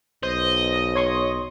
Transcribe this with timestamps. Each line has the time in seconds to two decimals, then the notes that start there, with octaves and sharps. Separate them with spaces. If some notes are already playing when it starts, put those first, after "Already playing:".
0.23 B1 C5 D#5
0.95 C#5 C6 C#6